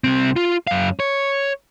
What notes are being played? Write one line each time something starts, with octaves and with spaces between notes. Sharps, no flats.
C2 C4
F4
F#2 F5
C#5